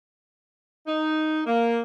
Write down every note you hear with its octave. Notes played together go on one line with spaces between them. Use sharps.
D#4
A#3